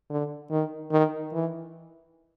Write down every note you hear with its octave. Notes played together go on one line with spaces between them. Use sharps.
D3
D#3
D#3
E3